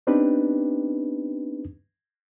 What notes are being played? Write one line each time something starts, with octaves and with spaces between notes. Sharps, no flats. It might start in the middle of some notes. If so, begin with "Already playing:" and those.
B3 C4 D4 D#4 G4 B4